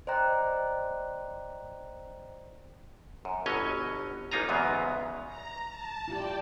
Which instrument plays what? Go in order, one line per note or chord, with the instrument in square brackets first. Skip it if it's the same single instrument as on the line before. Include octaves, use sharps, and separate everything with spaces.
[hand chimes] C5 D5 D#5 G5 A#5 F#6
[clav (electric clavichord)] F#2
G1 B2 F#3 C#4 C#5 D#5
A1 A#3 D#4 F4 G#5 A#5
E2 G#2 C#3 F#3 B3
[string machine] A#5
A5
[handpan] E4 F4 G4 [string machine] D5 G5